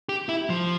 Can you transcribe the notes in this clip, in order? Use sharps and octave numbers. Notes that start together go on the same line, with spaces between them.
G4
E4
F3